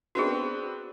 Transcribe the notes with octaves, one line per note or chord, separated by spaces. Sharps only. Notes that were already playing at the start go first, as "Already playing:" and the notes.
B3 C4 D4 F#4 G#4